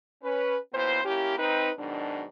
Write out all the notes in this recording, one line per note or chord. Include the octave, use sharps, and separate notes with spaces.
C#4 B4
F#2 A#2 B3 E4 C5
A#3 C#4 E4 G4
C4 D#4 B4
G#2 B2 D#3 F#3 D4